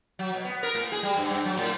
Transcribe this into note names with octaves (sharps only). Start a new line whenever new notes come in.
F#3
B2
B3
A#4
A2
G#4
G3
G2
G2
F#3
A2